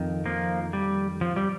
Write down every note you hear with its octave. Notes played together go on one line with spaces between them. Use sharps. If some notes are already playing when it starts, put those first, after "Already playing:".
Already playing: F2 D#3
F3 A#3
G3
F3
G3